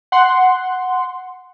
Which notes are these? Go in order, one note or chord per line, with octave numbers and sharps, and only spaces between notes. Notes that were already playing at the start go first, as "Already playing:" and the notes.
F#5 C6